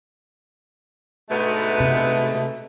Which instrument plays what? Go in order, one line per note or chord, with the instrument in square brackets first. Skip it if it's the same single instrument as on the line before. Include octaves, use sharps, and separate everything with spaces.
[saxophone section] D2 G#2 B3 [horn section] B2 G#3 A3
[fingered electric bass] C3